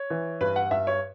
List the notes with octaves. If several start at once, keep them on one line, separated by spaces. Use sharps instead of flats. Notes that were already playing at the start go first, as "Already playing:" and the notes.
Already playing: C#5
E3
G2 B4
F#5
G2 E5
C#5